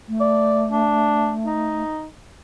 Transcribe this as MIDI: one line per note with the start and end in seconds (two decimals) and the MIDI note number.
0.08 1.83 57
0.21 0.66 74
0.71 1.34 62
1.46 2.07 63